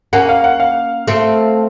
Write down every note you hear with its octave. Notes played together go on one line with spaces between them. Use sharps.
A#3 C#4 F#5
F5
F#5
F5
A3 C4